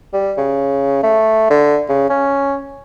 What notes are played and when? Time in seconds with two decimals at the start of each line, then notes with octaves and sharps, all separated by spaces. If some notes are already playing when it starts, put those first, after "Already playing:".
0.13 G3
0.37 C#3
1.03 A3
1.50 D3
1.89 C#3
2.09 C#4